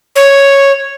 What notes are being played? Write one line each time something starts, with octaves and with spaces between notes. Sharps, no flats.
C#5